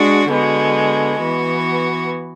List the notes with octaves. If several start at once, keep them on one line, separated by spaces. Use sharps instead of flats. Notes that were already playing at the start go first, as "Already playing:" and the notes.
Already playing: G#3 D4 F#4
D3 G#3 B3 F#4
E3 B3 F#4